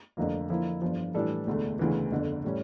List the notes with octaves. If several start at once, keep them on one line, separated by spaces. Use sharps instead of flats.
F1 F2 D3 F3 A#3
D3 F3 A#3 E4
G1 G2 F3
A2 E3 G3 D4 A4
E1 D2 D3 A3
E1 D2 C#3 E3
G1 F2 D3
A2 G3 C#4